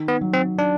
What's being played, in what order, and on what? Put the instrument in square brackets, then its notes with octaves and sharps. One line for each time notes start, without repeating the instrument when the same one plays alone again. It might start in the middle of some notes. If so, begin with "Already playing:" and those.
Already playing: [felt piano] D#3
[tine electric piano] B3
[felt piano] F#3
[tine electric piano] C4
D4